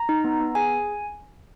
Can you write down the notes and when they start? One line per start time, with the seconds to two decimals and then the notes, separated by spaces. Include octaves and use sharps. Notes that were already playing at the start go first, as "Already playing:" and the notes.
Already playing: A#5
0.09 D#4
0.24 B3
0.40 B3
0.55 G#4 G#5